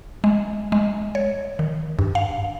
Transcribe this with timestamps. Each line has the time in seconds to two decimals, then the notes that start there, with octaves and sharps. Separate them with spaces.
0.24 G#3
0.72 G#3
1.15 C#5
1.59 D#3
1.99 G2
2.15 F5